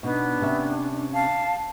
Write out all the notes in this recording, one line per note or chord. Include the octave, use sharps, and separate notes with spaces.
B2 B3 D4 D#4
C3 C#4 E5
F5 A5